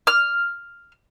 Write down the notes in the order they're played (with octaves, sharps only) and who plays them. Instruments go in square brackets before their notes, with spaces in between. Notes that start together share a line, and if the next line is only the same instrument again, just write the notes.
[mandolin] F6